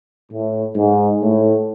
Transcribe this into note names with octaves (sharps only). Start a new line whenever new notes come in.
A2
G#2
A2